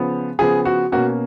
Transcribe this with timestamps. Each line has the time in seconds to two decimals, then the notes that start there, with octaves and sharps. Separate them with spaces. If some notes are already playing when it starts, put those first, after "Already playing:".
Already playing: C#3 F3 B3
0.39 C#3 F3 B3 G#4
0.65 F#4
0.92 B2 A#3 C#4 F#4